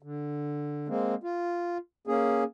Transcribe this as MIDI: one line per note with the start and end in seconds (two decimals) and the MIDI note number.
0.03 0.88 50
0.88 1.15 56
0.88 1.15 58
0.88 1.15 60
1.23 1.78 65
2.07 2.44 58
2.07 2.44 61
2.07 2.44 68